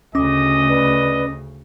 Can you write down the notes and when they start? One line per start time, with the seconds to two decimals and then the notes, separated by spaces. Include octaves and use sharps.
0.15 D2 C#3 C#4 D#5 D6
0.69 B4 D5